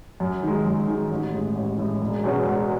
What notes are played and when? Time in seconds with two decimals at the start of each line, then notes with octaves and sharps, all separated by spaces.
0.20 F#2
0.43 D#3 G#3
0.65 F#2
0.88 D#3 G#3
1.11 A1
1.33 A2 G#3
1.55 A1
1.78 A2 G#3
2.01 E1
2.24 E2 B2 G#3 C#4
2.46 E1